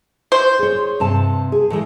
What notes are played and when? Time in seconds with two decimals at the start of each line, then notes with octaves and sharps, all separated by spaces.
0.32 C5
0.59 G#4 C#5
1.00 G2 C3 A5
1.52 G#4
1.70 A2 E3 G#3